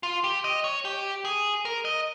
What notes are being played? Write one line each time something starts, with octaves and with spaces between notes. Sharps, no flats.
F4
G4
D#5
C#5
G4
G#4
A#4
D#5